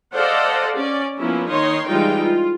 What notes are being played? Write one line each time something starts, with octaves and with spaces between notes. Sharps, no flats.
A4 C5 D5 D#5 F5 F#5
C#4 D5
F3 A#3 B3 C#4 E4
D#3 D#4 C#5 D#5 C6
E3 G3 G#3 D#4 F4 G5
F4